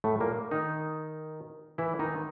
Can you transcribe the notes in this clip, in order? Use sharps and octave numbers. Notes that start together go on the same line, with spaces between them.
A2 A3
A#2 A#3
D#3 D#4
E3 E4
D#3 D#4